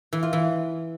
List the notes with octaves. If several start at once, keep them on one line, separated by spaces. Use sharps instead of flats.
E3
F4
E3